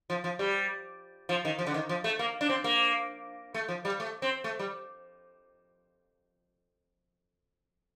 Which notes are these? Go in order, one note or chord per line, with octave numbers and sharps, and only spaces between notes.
F3
F3
G3
F3
D#3
F3
D3
D#3
F3
A3
A#3
D4
C4
A#3
A3
F3
G3
A3
C4
A3
G3